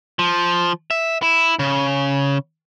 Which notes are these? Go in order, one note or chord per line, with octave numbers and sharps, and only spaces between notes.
F3
E5
E4
C#3